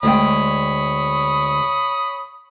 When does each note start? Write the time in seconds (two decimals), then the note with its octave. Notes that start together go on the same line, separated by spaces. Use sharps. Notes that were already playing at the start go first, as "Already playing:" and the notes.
0.03 D2 G#3 C#5 G5 B5 D#6